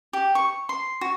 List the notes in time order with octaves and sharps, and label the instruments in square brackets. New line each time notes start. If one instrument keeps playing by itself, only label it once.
[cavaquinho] G4
C#6
C6
F#4